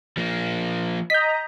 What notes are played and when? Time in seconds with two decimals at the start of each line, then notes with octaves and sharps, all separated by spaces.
0.17 F3 A#3
1.10 D#5 A#5 G6 B6